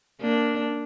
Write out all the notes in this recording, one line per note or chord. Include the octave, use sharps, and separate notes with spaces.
A#3 D4